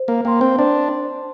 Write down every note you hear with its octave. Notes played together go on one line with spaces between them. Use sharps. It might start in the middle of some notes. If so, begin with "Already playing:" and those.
Already playing: C5
A#3
A#3 G5 C6
C4
D4 C5